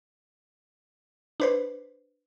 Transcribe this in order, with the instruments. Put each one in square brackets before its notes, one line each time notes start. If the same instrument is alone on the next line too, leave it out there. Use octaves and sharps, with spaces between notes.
[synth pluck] D4 B4 C5